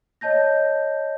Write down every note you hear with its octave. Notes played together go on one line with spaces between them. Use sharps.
C#5 D#5 A5 G6 A#6